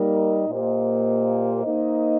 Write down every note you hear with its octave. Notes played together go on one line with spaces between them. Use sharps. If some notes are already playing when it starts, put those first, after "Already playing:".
Already playing: G3 A#3 D#4 A#4 D#5
A#2 A#3 G4 C5 D#5
A#3 D#4 C5 D#5